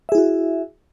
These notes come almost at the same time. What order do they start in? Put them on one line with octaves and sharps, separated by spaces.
E5 G#4 E4 F#4